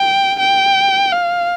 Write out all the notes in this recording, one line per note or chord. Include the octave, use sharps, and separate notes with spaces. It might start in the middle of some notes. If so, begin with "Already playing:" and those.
Already playing: G5
G5
F5